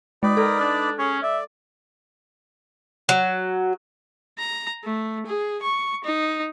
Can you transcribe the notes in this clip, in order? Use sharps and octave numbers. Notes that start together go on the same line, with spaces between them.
G#3 D#4 B4 D5
A4 A#4
D4
C#4 G#4 C#5
D5 E5
F#3
A#5
A3
G#4
C#6
D#4